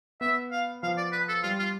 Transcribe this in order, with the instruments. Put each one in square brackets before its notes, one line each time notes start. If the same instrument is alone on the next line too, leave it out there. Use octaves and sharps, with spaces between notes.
[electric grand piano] B3 [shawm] E5
[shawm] F5
[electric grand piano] F3 [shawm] F5
[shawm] D5
B4
A4
[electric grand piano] G3 [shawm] F4
[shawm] F4